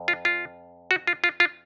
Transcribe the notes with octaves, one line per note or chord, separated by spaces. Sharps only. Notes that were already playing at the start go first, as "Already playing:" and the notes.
Already playing: F2
F4
F4
F#4
F4
F4
F4